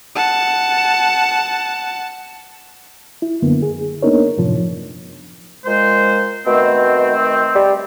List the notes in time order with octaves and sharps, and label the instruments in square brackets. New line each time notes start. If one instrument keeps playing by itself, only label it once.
[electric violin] F#5 A5
[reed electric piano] E4
F#2 D3 A#3 B3
G#4
A#3 B3 D4 D#4 A#4 C#5
F#2 A2 C3 F3
[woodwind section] A#2 G#3 C5
[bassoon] B2 [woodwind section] D#3 A3 C4
[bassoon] G3